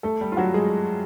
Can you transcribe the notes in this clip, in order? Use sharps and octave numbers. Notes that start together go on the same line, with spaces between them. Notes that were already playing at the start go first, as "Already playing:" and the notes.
A3 A4
G3 G4
F4
F#3 F#4
G#3 G#4